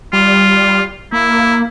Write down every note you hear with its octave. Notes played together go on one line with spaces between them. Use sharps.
G3 F4
A#3 E4